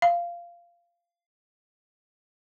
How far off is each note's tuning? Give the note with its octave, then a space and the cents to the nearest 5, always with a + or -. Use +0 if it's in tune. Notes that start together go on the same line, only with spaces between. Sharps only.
F5 -15